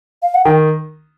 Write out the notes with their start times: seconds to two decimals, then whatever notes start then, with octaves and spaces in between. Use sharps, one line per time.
0.23 F5
0.34 F#5
0.45 D#3 G5